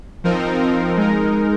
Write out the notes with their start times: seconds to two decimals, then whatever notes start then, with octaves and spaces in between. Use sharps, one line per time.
0.24 F3 C4 D#4 A#4
0.97 G#3 D#4 A#4